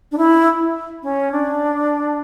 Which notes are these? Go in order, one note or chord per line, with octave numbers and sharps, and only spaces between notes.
D4
E4
C#4
D4